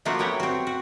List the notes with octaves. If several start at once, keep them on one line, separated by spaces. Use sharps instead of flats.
F3 A3 A#3 D4 F4 F#4
F#3 B3 G4 C#5 F#5
C4 F#4
F#4